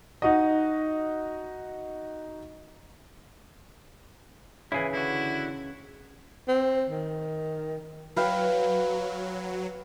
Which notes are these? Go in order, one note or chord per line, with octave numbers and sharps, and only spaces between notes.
D#4 F#4 D#5
C#3 E3 E4 G#4
D3 E4 F#4
C4
D#3
F#3 B4 F5 G5